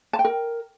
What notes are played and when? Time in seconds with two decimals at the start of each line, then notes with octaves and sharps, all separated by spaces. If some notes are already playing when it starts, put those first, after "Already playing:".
0.13 A5
0.19 G5
0.25 A#4